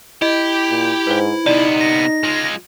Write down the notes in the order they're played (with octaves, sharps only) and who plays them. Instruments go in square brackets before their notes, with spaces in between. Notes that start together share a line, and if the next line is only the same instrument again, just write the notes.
[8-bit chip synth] E4 [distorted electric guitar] G4 [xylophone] D#5
[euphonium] A#2
[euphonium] G#2 [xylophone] B4 C5
[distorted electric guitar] C3 B3 [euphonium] D#4 [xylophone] D5
[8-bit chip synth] A#6
[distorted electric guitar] G#3 F4